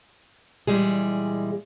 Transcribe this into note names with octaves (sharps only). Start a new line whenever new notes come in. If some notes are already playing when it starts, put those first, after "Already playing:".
A#2 E3 G3 G#3 G#4